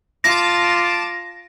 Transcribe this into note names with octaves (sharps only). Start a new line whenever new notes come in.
F4 A5 D6 A#6 E7